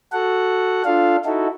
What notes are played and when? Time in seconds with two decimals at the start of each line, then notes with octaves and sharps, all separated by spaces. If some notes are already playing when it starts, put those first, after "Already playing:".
0.12 F#4 A4 F#5
0.85 D4 F4 A4 F5
1.25 D#4 E4 F#4 A4